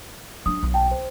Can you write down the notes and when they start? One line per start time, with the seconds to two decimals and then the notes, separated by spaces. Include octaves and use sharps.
0.46 F#3 D4 D#6
0.63 B1
0.74 G5 A5
0.91 C5